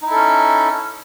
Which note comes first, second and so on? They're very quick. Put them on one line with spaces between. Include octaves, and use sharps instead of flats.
D#4 E4 A4 C#4